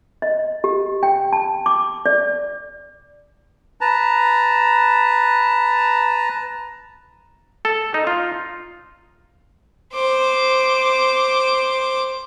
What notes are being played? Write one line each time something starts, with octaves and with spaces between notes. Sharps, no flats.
D#5
G4
G5
A5
D6
D5
B4 A5 A#5
A4
D#4
F4
C5 D6